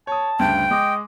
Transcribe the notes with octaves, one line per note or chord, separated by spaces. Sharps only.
C#5 A5 D#6
D2 G2 C#3 G5
G#3 D#5 D6